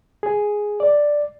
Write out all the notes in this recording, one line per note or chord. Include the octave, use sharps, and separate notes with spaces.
G#4
D5